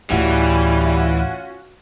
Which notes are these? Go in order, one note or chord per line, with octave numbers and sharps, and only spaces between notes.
D2 A2 E3 G3 C#4 F4 F#4